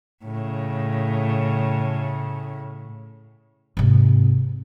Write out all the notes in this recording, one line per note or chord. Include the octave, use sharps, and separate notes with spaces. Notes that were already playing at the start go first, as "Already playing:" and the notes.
A2 C#3
G#2 C3